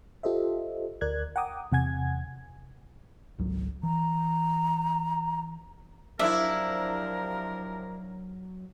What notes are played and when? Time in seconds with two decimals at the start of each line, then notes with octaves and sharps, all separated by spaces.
0.23 F4 G4 A4 C5 D#5 E5
1.01 D2 A#4 D5 F#6 G#6
1.36 F#5 G5 A#5 D6 D#6
1.72 E2 C3 F#5 G#5 G#6
3.39 G#1 C#2 F#3
3.83 E3 A#5
6.19 C3 F3 F#3 D4 E4 A#4 E5